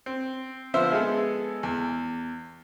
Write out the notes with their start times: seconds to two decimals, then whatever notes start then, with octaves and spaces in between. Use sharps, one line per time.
0.06 C4
0.74 D3 F3 B3 C5 E5 E6
0.92 G#3 B3 G#4 A4
1.63 E2